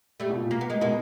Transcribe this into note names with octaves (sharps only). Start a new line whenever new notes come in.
G3 A3
B2
A#2
A#3
B3
G#3 A#3
B2 G#3 A#3